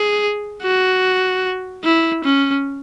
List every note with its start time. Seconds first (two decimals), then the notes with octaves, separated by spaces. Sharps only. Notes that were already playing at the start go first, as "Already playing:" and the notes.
Already playing: G#4
0.63 F#4
1.84 E4
2.24 C#4